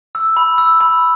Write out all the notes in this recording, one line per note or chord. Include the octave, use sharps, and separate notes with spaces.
E6
B5
E6
B5